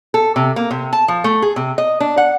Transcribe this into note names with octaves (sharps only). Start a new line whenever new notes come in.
A4
C3
A#3
C3
A5
F3
A3
G#4
C3
D#5
D4
F#5